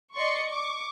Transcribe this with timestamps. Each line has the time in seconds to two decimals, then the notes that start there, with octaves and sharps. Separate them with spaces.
0.16 D5 D#5 C6 C#6 C#7
0.47 C#6 D6